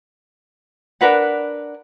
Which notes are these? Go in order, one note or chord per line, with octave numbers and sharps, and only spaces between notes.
D4 A#4 B4 F#5